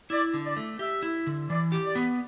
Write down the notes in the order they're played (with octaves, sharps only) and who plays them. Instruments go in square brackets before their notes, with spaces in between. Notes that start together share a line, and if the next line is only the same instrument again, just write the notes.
[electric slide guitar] E4 [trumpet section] D5
[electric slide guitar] D3
[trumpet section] D5
[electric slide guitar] A3
[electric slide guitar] G4 [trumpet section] E5
[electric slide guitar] E4
D3
[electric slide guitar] E3 [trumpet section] D5
[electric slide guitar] G4
[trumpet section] D5
[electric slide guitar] B3